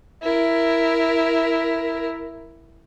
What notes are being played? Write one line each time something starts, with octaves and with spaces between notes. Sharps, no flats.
E4 A#4